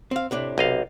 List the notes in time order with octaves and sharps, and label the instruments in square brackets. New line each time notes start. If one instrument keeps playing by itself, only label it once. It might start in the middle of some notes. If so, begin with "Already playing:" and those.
[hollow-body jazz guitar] C4 F5
A2 C3 D4
[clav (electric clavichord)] B1 D#5 F5 [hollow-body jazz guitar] C3